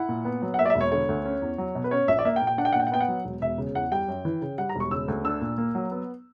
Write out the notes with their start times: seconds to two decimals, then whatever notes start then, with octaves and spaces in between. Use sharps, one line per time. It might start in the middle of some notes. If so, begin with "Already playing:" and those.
Already playing: E4 F#5
0.09 A#2
0.25 B3
0.42 F#3
0.54 F#5
0.59 A#3 E5
0.65 D5
0.70 E5
0.75 E1
0.81 C#5
0.92 D3 C#5
1.09 D2
1.25 C#4
1.42 E2
1.58 F#3
1.75 B2
1.84 B4
1.91 C#4 C#5
2.08 A#1 E5
2.19 D5
2.25 A#3 E5
2.36 G5
2.42 A#2
2.47 G5
2.58 D4 F#5
2.65 G5
2.73 F#5
2.75 A#2 G5
2.87 F#5
2.92 B3 G5
3.00 F#5
3.08 F#3
3.25 E1
3.42 E1 E5
3.58 C#3
3.75 E2 F#5
3.92 G3 G5
4.08 F#2
4.25 E3
4.41 C#3
4.58 G3 F#5
4.69 A#5
4.75 E1 C#6
4.91 C#3 E6
5.08 D2
5.25 D4 E6
5.41 A#2
5.58 A#3
5.75 F#3
5.91 B3